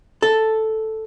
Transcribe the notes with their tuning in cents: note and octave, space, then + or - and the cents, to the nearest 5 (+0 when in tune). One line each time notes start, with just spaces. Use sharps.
A4 +0